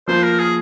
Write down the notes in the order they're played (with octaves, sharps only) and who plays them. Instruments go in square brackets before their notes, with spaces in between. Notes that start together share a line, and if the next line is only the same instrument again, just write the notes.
[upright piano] F3 A#3 F4 [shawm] C5
[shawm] A#4
G#4